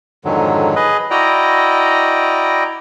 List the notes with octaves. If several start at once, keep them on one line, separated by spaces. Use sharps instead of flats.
F2 G#2 D3 D#3 F#3
G#4 B4 D#5
E4 F#4 D5 D#5 G5 A#5